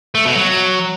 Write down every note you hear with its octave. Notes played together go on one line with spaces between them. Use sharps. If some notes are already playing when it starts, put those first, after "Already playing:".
A3
B2
F#3